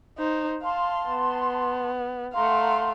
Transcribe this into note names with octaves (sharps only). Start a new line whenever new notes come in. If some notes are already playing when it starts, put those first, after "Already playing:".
D#4 C5
F5 A5 C6
B3
A3 F5 F#5 A#5 C6